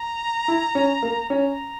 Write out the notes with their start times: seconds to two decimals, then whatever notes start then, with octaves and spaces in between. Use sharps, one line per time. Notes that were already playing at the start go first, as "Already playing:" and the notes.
Already playing: A#5
0.48 E4
0.75 C#4
1.02 A#3
1.30 C#4 A#5